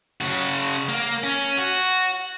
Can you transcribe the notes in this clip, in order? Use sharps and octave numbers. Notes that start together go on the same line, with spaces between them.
C#3 F#4
A#3
C#4
F#4